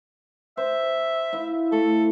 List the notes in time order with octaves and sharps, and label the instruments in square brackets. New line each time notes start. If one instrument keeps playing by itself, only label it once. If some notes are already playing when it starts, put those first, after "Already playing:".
[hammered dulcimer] C5 [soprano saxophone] E5
[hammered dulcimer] E4 F5
[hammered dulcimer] A3 [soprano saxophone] A4